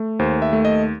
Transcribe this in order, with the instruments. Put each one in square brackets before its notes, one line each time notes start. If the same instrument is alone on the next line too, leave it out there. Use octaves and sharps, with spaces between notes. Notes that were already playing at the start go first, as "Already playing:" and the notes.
Already playing: [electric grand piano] A3
D#2 C5
E5
A3
D#5